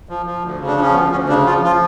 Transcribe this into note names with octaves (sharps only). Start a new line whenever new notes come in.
F3
F3
D2
C#3
D4
F3 C#4
D2 B3
D2 C#4
C#3 D4
F3 F4
F3 F4